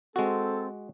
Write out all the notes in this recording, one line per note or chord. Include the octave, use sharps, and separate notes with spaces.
G#3 C4 F#4 A4